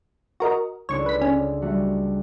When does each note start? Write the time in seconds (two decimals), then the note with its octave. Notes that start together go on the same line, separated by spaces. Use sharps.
0.40 F#4 A#4 D#5
0.89 C#2 D4 A4 C#5 C#6
1.06 B4 B6
1.21 C#4
1.62 G3 A3 F#4